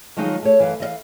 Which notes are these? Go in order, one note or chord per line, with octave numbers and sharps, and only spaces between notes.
D#3 F3 F#3 G#3 D#4
A3 C#5
F#2 E3 B4 F5
E3 D#5 F5